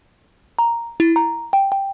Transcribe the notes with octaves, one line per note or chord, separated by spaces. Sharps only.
A#5
E4
A#5
G5
G5